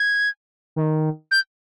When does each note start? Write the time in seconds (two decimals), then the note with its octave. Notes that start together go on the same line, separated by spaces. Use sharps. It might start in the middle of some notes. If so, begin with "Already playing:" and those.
Already playing: G#6
0.76 D#3
1.31 G6